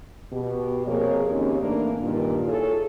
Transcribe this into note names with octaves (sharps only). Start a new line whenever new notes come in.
B2 G4
F2 C3 A#3 G#4 A#4 C#5
D#2 C#3 C4
A2 E3 A#3 D4
G2 A#2 D#3
E4 F4 G#4 A4 C#5